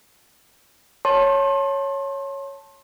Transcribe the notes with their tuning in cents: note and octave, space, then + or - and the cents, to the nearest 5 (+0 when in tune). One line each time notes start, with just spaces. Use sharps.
C#5 -5 A5 +0 C6 +35